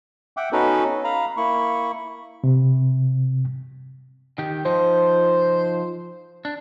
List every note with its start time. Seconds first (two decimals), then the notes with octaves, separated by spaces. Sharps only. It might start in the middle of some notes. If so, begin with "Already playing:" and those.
0.37 E5 F#5 G5 D6
0.52 B3 C#4 D#4 F#4 A4 B4
1.04 F5 A#5 B5
1.37 A#3 E4 B5 C#6
2.44 C3
4.38 D#3 G4
4.65 F3 D#4 C5
6.45 D4